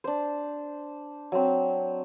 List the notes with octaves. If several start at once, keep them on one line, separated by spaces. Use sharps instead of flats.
D4 C5
F#3 C4